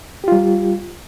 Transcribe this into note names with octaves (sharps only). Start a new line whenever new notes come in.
G3 F4 G4